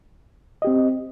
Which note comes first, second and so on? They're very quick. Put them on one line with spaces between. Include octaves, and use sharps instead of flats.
D#5 G4 C4